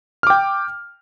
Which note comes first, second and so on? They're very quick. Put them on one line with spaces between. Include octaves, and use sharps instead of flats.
F6 D6 G5